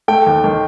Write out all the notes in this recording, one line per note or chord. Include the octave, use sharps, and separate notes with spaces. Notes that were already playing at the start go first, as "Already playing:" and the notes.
A3 G5
D#2
D#3